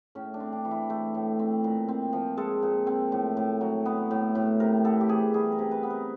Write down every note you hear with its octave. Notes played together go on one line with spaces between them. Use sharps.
A2 C#4
D4
C4
D4
E3
E4
A3
A2
C4
A#2
C4
F3
G#3 A4
A#2
C4
A2
A2
F#3
B3
A2
A2
C3 A#4
B3 A4
G4
E3 G#4
G3 G#4
A#4
C3
B4
B3
A#4